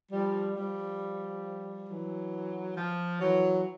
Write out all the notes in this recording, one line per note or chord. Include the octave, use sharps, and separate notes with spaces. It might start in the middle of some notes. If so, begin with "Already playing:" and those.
F3 G3
F3 G3
E3 F#3
F3
E3 F#3